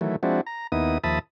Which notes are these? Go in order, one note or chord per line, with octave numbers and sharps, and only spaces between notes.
D#3 E3 F#3 A3
F3 G#3 C4 D4 E4 F#4
A#5
D#2 B3 D#4 E4 D#6
D#2 F3 E5 A5 B5 D#6